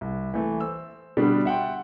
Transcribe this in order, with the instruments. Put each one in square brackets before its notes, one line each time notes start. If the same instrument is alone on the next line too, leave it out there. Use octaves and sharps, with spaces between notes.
[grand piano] C2
E3 A3
C5 E6
B2 D3 G3 D4
E5 F#5 G5 C6